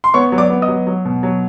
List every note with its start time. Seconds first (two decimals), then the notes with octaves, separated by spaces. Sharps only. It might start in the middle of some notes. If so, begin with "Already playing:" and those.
0.04 C6
0.14 B3 C#5 C#6
0.32 F#3
0.38 D5 D6
0.50 B3
0.62 D#5 D#6
0.68 F#3
0.87 F#3
1.05 B2
1.23 F#3